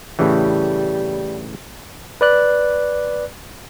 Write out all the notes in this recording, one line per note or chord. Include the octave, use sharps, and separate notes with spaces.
A2 C#3 E3 G3
B4 D5 F#6